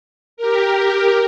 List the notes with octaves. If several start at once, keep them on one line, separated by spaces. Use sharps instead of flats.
G4 A#4